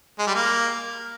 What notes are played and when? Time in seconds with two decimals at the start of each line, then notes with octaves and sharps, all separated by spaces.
0.19 G#3
0.27 G3
0.35 A#3